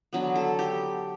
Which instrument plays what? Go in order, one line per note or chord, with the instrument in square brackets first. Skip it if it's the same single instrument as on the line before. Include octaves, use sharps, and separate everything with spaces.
[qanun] D3 F#3 B3
A4
G4